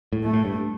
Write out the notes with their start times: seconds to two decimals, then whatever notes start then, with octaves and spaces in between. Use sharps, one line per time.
0.13 A2
0.24 A3
0.33 A2
0.45 G2